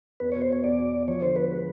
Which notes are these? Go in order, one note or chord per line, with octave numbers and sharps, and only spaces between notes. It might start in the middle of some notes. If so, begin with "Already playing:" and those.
E2 B4
B2 C#5
C5
B2 C#5
E2 D5
B2
B2
F3 C#5
D3 C5
F3 B4
G#3